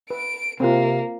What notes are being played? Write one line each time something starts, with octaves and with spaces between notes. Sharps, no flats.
B4 D7
C3 A#3 C4 F4